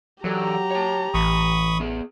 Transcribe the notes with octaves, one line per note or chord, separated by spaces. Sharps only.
E3 F#3 G4 A4 D5 A#5
C#5 A5
A1 E3 B5 C#6 D#6
B3 G#4